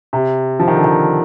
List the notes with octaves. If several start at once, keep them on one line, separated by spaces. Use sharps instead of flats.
C3
F3
D#3
D3
D#3